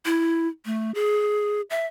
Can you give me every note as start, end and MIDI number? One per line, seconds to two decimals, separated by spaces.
0.06 0.48 64
0.66 0.91 57
0.95 1.61 68
1.70 1.86 76